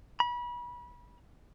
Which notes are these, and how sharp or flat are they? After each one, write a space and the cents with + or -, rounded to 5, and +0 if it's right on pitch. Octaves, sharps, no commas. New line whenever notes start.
B5 -30